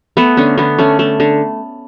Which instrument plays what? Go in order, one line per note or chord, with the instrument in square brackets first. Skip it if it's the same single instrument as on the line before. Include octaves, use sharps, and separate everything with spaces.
[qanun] A3 B3
D3 C#4
D3 B3
A3 C#4
A3
D3